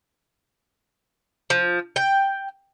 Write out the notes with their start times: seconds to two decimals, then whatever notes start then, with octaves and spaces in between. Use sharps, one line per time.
1.50 F3
1.96 G5